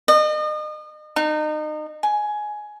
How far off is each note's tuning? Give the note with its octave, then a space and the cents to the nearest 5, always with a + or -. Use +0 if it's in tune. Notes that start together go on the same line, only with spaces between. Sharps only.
D#5 -35
D#4 -30
G#5 +15